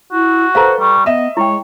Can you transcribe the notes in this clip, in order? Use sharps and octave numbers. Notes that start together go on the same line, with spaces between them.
E4 F#4
A4 B4 C5 F5 A#5
G3 C#6
B3 D#5 E5 E7
G#3 E4 C#5 G5